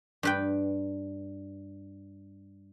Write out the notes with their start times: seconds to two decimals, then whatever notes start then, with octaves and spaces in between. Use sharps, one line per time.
0.23 G2 B4 G5